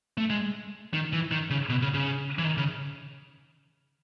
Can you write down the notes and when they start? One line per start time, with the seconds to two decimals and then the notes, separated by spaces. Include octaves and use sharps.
0.18 A3
0.30 G#3
0.94 D#3
1.13 E3
1.31 D#3
1.50 C#3
1.69 B2
1.82 C#3
1.94 C#3
2.38 E3
2.45 D#3
2.57 C#3